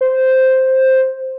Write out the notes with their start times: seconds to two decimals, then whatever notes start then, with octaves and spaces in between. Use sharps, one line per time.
0.01 C5